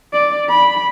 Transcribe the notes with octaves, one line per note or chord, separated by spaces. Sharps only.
D5
B5